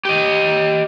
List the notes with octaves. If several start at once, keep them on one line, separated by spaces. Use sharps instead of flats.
G4 D#5